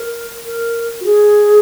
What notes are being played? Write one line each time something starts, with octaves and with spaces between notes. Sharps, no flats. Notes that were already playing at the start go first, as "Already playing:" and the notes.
Already playing: A#4
A#4
F#4
G#4